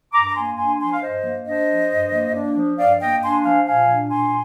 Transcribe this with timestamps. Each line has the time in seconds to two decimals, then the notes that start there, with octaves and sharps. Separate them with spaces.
0.13 G2 A#5 D6
0.26 A#5
0.35 A#3 G#5 C6
0.58 D4 G#5 C6
0.80 F3 G#5 C6
0.91 F5
1.02 G2 C5 D#5
1.24 A#3
1.46 D4 C5 D#5
1.68 F3
1.90 G2
2.12 A#3
2.35 D4
2.56 F3
2.78 G2 D5 F5
3.01 A#3 D#5 G5
3.22 D4 G#5 C6
3.44 F3 F5 G#5
3.67 A#2 F5 G#5
3.89 D4
4.11 A#2 G#5 C6